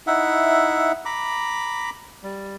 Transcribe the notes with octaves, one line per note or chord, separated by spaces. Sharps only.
D#4 E4 E5 F#5
A#5 B5 D6
G3